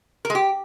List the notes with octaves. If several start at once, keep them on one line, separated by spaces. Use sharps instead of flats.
A#4
G#3
G4